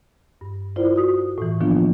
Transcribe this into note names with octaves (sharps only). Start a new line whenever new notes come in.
G2
E4 F4 A#4 C5 D5
F#4 D#6
A2 E3
D#3 F3 A#3 B3 D4 F4